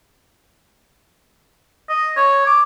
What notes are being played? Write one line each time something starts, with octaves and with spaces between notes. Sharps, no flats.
D#5
C#5
D6